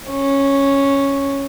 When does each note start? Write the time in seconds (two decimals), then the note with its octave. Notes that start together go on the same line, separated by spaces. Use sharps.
0.10 C#4